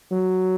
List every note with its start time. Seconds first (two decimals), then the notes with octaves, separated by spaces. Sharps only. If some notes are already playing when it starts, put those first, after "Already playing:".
0.11 F#3